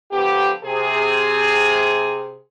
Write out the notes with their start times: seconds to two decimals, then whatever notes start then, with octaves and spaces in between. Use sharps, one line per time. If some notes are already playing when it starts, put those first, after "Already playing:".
0.12 D3 F3 B3 G4
0.64 C3 G#4